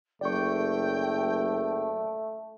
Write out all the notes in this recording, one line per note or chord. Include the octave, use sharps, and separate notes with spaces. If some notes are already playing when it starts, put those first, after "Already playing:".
F#1 A3 D5 G5 C#6